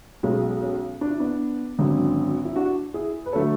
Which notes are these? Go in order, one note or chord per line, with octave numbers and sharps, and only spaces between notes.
B1 B2 G#3 C#4
C#4
D4
E4
B3 D4
G#1 F#2 D3 F#3
E4
D4 F#4
E4 G#4
B4
D3 F#3 A3 A4 C#5